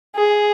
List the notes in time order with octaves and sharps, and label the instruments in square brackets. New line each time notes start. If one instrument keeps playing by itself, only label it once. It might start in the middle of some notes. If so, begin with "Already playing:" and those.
[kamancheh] G#4